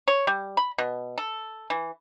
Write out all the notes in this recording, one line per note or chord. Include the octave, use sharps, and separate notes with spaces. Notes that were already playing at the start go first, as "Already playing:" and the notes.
C#5
G3
B5
B2
A4
E3